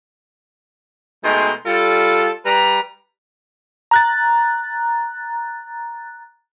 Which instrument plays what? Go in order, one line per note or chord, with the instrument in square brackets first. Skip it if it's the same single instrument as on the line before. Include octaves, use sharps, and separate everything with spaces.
[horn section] B2 G#3 A3 D#4 G5 C6
G3 F4 A4
G3 B4 A#5
[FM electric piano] A#5 F#6 A6